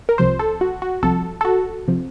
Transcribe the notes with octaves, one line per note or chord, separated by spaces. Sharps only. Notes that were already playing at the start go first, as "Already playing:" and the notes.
A#4
C2 C3 F3 C5
A4
F#4
F#4
C2 C3 F3 A4
A4
F#4
C3 F3